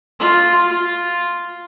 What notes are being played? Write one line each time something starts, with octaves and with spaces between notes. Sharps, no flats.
F4
F4